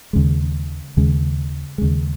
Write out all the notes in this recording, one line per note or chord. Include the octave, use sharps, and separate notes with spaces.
D#2 C#3 G#3
D#2 C#3 G#3
D#2 C#3 G#3